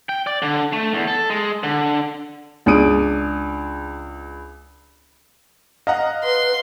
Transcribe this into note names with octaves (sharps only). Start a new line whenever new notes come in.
G5
D5
D3
A3
E2
A4
G#3
D3
C#2 D4 G#4 D#6 D7 D#7
D#5 F5 F#5 A#5
B4 C6